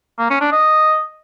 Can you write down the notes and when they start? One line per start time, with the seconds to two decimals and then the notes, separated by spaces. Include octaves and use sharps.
0.19 A#3
0.30 C#4
0.41 D4
0.52 D#5